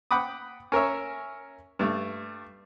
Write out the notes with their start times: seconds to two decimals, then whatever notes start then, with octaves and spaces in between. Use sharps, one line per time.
0.11 F#5 G5 B5 D6 D#6
0.72 C#4 A#4 C#5 E5
1.79 G2 A3